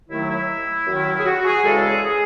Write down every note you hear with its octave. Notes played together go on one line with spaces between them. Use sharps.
D#2 D#3 F#3 A3 E4
E4
F#2 D#3 F#3
G#4
F#4
G#4
E2 C#3 G#3 A4
G#4
G#4